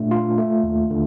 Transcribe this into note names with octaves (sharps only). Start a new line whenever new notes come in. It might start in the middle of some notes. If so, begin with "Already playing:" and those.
Already playing: A#2 A3 D4
F4
A3
D#2
D3